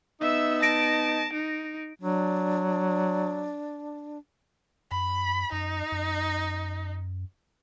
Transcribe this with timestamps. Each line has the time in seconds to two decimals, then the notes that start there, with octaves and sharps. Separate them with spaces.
0.21 B3 D#4 E5 E6
0.62 A5 A#6 D7
1.33 D#4
2.02 F#3 D4
4.91 F#2 B5
5.52 F#2 D#4
5.92 F#2